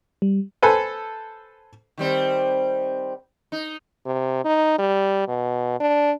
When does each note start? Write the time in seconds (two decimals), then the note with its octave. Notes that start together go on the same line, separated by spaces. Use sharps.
0.22 G3
0.62 A4 B4 C5 G#5
1.98 D#3 G3 C4
3.52 D#4
4.06 C3
4.45 D#4
4.79 G3
5.28 B2
5.80 D4